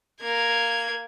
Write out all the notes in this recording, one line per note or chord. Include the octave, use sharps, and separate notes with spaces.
A#3 G#6